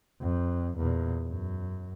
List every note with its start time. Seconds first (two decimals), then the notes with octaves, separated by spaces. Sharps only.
0.22 F2
0.77 E2 A#2
1.28 F#2